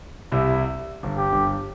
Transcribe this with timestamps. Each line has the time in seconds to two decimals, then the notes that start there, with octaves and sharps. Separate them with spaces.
0.32 C2 C3 E4
1.03 G1 G2
1.18 G4
1.32 G1 G2